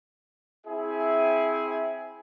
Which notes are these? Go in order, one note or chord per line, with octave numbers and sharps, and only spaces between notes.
C4 E4 G#4 E5 G#5